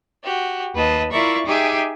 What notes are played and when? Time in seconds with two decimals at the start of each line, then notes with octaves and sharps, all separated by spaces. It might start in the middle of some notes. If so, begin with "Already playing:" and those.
0.24 F#4 G4
0.74 D#2 B4 D#5 A5
1.11 E4 F4 A#4 D5 E5 C#6
1.46 D#4 G4 G#4 E5 G#5 D6